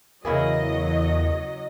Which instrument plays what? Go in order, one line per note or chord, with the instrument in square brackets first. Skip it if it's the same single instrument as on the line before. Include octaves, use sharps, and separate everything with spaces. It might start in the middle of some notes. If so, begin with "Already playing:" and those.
[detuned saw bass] E2 [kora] C#3 E4 G#4 [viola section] F#3 D#5 [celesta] A#4 F5